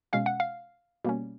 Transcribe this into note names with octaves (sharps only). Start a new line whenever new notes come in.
B2 G#3 C#4 F5
F#5
F5
B2 G3 A#3 C#4